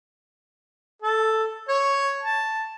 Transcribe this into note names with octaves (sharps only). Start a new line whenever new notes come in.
A4
C#5
A5